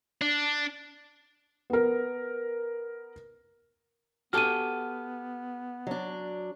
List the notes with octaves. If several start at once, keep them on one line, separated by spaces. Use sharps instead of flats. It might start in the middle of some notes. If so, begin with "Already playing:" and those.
D4
B3 A#4
B3 F#4 G4 A4 F6 D#7
F#3 D4